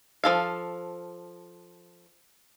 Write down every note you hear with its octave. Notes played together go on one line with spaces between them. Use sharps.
F3 A4 F5